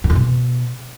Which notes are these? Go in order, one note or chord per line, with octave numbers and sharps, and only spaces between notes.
A2
F2
B2